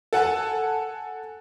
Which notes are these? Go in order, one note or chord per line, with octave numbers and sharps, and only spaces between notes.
A4 F#5 G#5 A5